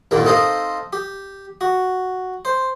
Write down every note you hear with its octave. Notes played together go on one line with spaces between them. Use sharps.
C2 G2 A#2 D3 D#3 A#3
C4 D#4 A4 D#5 F5
G4
F#4
C5